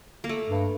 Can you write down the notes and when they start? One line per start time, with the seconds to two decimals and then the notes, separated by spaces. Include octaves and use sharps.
0.24 A#3
0.29 A3
0.47 G2